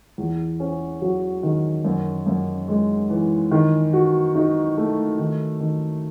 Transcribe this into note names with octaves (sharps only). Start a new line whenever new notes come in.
E2
C#4
F#3
D#3
F#2
F#2
G#3
E3
D#3
F#4
D#4
A3
D#3
D#3